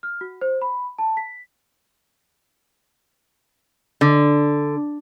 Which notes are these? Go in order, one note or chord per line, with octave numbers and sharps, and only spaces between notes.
F6
F#4
C5
B5
A5
B6
D3